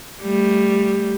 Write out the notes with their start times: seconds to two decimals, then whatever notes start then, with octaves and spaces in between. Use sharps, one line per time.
0.22 G3 A3